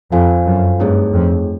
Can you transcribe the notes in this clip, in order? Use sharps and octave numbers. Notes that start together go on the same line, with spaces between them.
F2 F4 A4 C5 F5 G#5
F#2
G2 A3 C4 D#4 G#4 C#5
F2